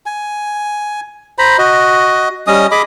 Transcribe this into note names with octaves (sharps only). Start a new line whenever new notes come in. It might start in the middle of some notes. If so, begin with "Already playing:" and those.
G#5
C5 A#5 B5
F#4 D#5
G3 C#4 D#5 D#6
G#4 D#5 B5 D6